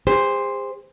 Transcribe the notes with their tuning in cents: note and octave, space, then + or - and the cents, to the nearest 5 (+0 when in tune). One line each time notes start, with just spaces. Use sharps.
G#4 -45 C5 +0